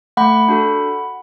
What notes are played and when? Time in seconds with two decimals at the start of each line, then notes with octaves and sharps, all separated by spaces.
0.17 A3 F#5 B5
0.48 D4 F#4 A4